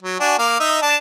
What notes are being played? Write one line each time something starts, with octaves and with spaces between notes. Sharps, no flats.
F#3
D4 F#4 G#5
A#3 F5 D6
D#4 D#5 E5
D4 A5